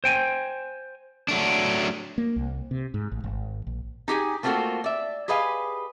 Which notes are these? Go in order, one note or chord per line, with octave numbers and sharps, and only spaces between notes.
C5 G5 G#5
F#3 A3 D4
A#3
C2
C3
G#2
A1
G#1
A#1
D#4 G4 G#4 G#5
A3 A#3 C4 F4 F#4 A4
D5 E5
G4 G#4 B4 D#5 F5 G#5